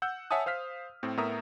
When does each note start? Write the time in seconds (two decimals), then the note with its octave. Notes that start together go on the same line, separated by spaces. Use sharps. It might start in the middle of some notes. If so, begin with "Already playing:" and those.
0.02 F#5 E6 G6
0.31 C#5 E5 F#5 G#5 A5 D#6
0.46 C5 F5 F6 B6
1.03 A2 C4
1.17 A2 B3 A#4 E5 A#5 D#6